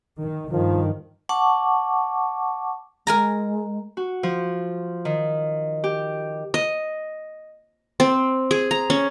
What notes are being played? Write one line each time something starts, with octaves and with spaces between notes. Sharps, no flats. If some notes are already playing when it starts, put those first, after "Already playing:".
D#3
G2 D#3 F3
F#5 A5 C#6 D6
G#3 A#4 G#5 A#5
F#4
F3
D#3
G4
D#5
C4
G#4
A#5
C#4